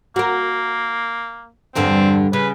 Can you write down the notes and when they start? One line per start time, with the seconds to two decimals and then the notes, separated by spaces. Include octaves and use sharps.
0.16 A#3 F#4 A#4
1.75 E2 G2 D3 C4
2.33 C#3 B4